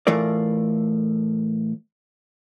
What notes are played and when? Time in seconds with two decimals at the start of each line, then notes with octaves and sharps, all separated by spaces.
0.07 A2 E3 A3 F4 A#4 D5